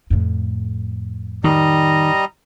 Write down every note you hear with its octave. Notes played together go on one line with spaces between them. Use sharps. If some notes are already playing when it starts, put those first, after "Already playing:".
F2 A2
D#3 G3 D#5 A#5